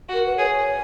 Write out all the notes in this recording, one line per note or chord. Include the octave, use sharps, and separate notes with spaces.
F#4
A#4
B4
G#4 C#5